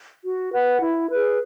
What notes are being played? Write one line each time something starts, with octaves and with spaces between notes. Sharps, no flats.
F#4
B4 F#5
E4
B4
G#4